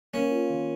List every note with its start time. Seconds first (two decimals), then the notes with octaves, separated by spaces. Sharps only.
0.14 A#3 C#4
0.31 F4
0.50 D#3